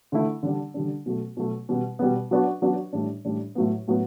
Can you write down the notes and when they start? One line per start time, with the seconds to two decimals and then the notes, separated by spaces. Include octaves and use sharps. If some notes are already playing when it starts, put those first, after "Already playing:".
0.12 D3 A3 E4
0.43 D3 G3 D4
0.74 D3 G3 D4
1.06 B2 F#3 A3
1.37 B2 F#3 A3
1.69 B2 G3 B3
1.99 B2 G3 B3
2.31 F#3 B3 D4 F#4
2.62 F#3 B3 D4 F#4
2.93 A2 G3 D4
3.25 A2 G3 D4
3.55 A2 F#3 B3
3.88 A2 F#3 B3